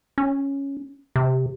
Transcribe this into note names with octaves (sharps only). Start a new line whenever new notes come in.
C#4
C3